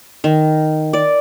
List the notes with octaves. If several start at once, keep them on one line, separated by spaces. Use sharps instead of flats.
D#3
D5